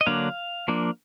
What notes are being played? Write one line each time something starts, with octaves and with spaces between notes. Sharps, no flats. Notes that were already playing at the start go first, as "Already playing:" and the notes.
D#5
D3 F#3 A#3 D4 F5
F3 A#3 D4